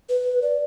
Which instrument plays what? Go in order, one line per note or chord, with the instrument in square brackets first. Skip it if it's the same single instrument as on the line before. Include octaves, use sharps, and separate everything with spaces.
[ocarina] B4
D5